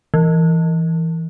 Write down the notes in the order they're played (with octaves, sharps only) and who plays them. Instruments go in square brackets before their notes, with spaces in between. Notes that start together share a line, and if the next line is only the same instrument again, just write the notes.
[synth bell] E3